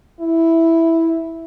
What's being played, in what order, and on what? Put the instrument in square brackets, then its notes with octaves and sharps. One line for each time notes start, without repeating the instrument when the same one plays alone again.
[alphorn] E4